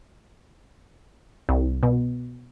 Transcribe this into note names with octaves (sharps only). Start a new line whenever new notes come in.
C2
B2